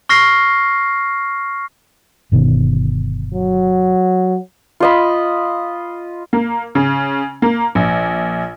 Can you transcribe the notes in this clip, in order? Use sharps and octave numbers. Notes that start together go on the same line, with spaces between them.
C#6 F6 A#6 C7
G1 B2 D#3
F#3
F4 D#5 B5
A#3
C#3
A#3
A#1